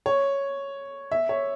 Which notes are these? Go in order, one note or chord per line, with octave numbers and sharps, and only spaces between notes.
C#5
E5
C#5